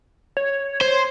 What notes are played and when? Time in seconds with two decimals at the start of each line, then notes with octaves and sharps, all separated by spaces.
0.37 C#5
0.81 C5